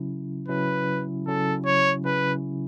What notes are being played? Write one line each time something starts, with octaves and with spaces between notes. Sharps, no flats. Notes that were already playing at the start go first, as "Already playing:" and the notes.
Already playing: C#3 F#3 C#4 E4
C#3 F#3 C#4 E4 B4
C#3 F#3 C#4 E4 A4
C#5
C#3 F#3 C#4 E4 B4